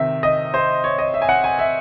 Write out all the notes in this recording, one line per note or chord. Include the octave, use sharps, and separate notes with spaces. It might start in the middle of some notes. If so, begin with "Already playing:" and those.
Already playing: C3 D#3 E5
D#5
C5
C#5
D#5
E5
G#5
F#5
G#5
E5